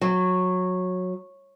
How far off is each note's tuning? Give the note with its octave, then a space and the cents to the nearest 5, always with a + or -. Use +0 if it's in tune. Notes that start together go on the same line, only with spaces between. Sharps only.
F#3 -15